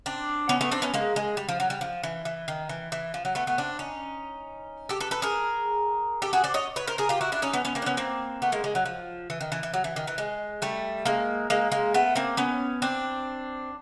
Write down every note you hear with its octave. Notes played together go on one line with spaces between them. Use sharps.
C4 D4
B3 C#4
A3 B3
C4 D4
B3 C#4
G#3 A#3
G#3
G3
F3
F#3
G3
F3
E3
E3
D#3
E3
E3
F3
F#3
A3 B3
A3 B3
C4 D4
C#4 D#4
G4 A4
A4 B4
A4 B4
G#4 A#4
G4 A4
F#4 G#4
C5 D5
C#5 D#5
B4 C#5
A#4 C5
G#4 A#4
F4 G4
E4 F#4
D4 E4
C#4 D#4
B3 C#4
B3 C#4
A#3 C4
D4
B3 C#4
A#3 C4
A3 B3
G#3 A#3
G#3
F#3
F3
E3
D#3
E3
E3
F#3
E3
D#3
E3
G#3
G3 A3
G#3 A#3
G#3 A#3
G#3 A#3
A3 B3
A#3 C4
B3 C#4
C4 D4